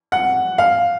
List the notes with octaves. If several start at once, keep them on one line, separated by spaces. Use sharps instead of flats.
F#5
F5